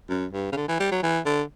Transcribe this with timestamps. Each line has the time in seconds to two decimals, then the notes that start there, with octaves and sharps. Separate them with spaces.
0.10 F#2
0.33 G2
0.52 C#3
0.57 D3
0.68 E3
0.80 G3
0.91 F#3
1.03 E3
1.25 D3